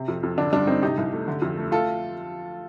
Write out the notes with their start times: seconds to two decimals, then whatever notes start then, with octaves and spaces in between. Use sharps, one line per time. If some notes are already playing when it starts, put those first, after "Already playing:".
Already playing: C3
0.08 F2
0.23 F2
0.38 D3 D4
0.52 G2 D4
0.67 G2 C4 D#4
0.82 C3 D#4 G4
0.97 C2
1.13 A3
1.28 D3
1.42 F2
1.57 A3
1.72 A3 F4 A4